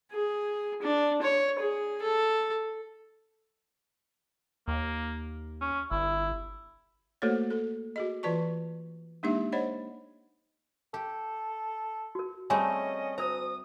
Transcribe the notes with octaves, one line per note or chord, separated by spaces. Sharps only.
G#4
D4
C#5
G#4
A4
D#2 A#3
C#4
G1 E4
A3 A#3 F#4 A4 C5 C#5
A4
F#4 G#4 D#5
E3 F4 B4 D5 A5 C#6
G#3 A#3 D4 D#4 G4 E5
C5 C#5 D#5 F#5 B5
G4 A4
F#4 A#4
G3 A3 C4 C#4 G#4 C#5 D#5 G#5
D2 A#4 C5 A#5 D#6